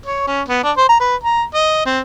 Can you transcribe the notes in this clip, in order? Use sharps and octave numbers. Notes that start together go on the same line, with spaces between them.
C#5
C#4
B3
D4
C5
A#5
B4
A#5
D#5
C4